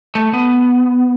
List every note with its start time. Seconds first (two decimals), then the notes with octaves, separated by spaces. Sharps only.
0.15 A3
0.33 B3